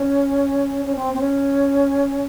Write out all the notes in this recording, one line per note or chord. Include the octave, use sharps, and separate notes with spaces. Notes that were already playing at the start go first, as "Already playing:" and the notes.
Already playing: C#4
C#4
C4
C4
C#4